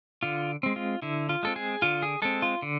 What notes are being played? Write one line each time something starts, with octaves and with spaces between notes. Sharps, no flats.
D3 F4
G#3 C4
F4
D3 E4
F4
G#3 C4 A4
G#4
D3 F4
G#4
G#3 C4 A4
F4
D3